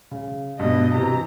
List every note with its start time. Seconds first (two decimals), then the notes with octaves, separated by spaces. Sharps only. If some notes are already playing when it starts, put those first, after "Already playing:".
0.11 C#3
0.59 G2 B2 D#5
0.94 C3 E3 A#5